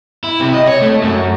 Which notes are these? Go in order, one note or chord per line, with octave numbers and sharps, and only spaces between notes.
E4
C3
D#5
C#5
A3
F#2